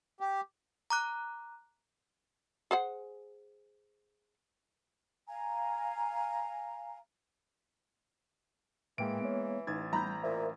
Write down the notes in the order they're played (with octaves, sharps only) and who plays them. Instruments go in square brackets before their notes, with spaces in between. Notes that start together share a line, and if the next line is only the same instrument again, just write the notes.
[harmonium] G4
[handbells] A#5 D6 F#6
[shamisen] G#4 C5 F#5
[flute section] F5 G#5 A#5
[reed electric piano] A2 G5 [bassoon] E3 [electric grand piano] G#3 A#3 D7
[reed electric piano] B3 C#5
[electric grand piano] A1 G#6 A6 [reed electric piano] D#4
[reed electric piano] G3 G6 [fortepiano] A#5 B5
[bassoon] A#2 [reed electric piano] A#4 C5 E5